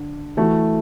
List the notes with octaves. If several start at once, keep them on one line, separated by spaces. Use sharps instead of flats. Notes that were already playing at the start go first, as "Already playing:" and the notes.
Already playing: D3
E3 A3 F#4